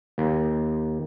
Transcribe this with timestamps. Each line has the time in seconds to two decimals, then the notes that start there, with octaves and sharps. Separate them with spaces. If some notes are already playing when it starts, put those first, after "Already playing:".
0.18 D#2